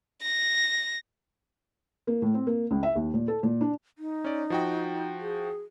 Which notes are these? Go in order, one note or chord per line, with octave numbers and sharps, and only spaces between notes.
A#6
A#3
A2
C4
A#3
C#2
E5
D#2
A#2
A4
A#2
D4
D#4
C#4 D5
F3 F#4 G5
G#4